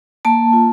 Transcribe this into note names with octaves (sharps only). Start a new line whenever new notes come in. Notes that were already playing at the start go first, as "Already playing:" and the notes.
A#3 A5
F4